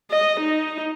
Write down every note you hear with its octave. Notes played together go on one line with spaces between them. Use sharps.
D#5
D#4